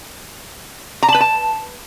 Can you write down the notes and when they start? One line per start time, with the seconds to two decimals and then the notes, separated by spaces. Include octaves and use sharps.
1.03 A#5
1.09 A5
1.14 B4
1.20 A5